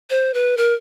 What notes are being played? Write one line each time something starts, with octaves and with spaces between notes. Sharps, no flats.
C5
B4
A#4